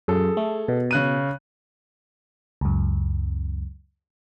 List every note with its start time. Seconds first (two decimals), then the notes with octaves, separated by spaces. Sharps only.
0.08 F#2 G#4 A4
0.37 A3
0.68 B2
0.91 C#3 F#6 D#7
2.61 C#2 F#2